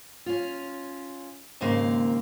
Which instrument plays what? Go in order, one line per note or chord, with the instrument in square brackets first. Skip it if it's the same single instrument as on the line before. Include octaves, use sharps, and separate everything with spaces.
[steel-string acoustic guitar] C#4 F4
D#2 G#2 C#3 A#3 C4